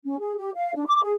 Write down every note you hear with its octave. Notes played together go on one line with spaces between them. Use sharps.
C#4
G#4
G4
F5
D4
D6
G#4